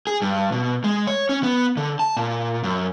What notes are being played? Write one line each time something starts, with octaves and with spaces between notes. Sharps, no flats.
G#4
G2
B2
G#3
C#5
C#4
B3
D3
A5
A#2
F#2